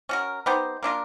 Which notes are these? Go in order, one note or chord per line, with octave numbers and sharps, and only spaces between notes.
C#4 F#4 A#4
B3 D#4 G4 C5
A#3 D4 F4 A#4